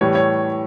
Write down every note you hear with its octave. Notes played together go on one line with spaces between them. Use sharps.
A2 E3 G3 C#5
C#5